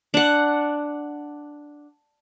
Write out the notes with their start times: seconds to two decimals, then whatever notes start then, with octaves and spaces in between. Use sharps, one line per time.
0.14 D4 F#5